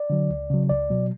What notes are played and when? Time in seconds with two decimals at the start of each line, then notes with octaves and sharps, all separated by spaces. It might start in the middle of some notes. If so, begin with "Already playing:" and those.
Already playing: D5
0.10 D3 F#3
0.30 C#2
0.50 C#3 F#3
0.69 C#2 D5
0.90 B2 F#3